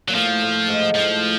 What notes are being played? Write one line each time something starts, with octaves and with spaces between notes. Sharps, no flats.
A#2 F#3
A2 F3
A2
G#2
A2 F3